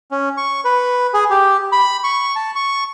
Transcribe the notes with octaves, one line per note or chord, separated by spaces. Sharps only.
C#4
C#6
B4
G#4
G4
B5
C#6
A5
C#6